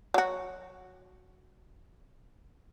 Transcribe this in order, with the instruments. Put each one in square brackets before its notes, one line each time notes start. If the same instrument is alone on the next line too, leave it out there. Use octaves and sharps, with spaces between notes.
[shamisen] F#3 F#4